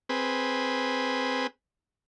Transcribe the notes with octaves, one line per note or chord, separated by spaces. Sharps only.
C4 G#4 B4